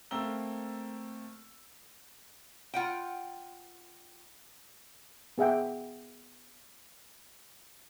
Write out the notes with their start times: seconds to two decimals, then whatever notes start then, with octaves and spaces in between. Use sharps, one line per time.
0.11 A3 A#3 C4 A#4 E6 G7
2.74 F4 F#5 G5
5.38 B3 G#4 E5 F#5 G5